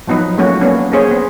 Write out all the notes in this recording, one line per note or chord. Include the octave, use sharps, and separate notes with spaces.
F3 F#3 B3 D#4 B4
F#3 A3 A#3 C#4 F#4
A#3 B3 C#4 D4
A#3 C#4 G#4 C5 C#5
B3